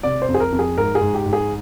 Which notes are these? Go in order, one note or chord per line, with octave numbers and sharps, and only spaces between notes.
C3 D5
C5
F2
G#4
A#4
F2
G#4
G#2 A#4
G#4
G#2
G4
G#2
G#4